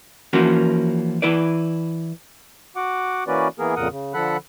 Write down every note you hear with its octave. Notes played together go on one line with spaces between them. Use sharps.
E3 F3 A#3 C#4 F#4
E3 E4 B4 D5
F#4 F#5 D6
E3 A#3 C#4 F#4 B4 D5
E3 A#3 B3 G#4 A#4
F2 A#2 C#3 A#4 F#5 D#6
C#3
D3 F3 A4 F#5 B5 F#6